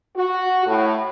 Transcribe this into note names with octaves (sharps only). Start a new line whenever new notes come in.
F#4
A2